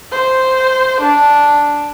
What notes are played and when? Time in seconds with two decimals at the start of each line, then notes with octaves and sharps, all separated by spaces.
0.12 C5
1.00 D4